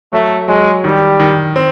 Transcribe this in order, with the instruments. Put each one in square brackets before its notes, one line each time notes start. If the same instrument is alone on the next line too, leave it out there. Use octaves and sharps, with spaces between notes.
[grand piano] F#3 [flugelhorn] A3
[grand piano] F#3 [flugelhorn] G#3
[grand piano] D#3 [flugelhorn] G3
[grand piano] D#3
C4